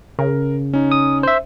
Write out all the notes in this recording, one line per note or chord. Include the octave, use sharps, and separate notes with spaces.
C#3 A#4
C#4 D#4
D#6
C5 E5